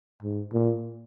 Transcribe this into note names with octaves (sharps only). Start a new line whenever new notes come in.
G#2
A#2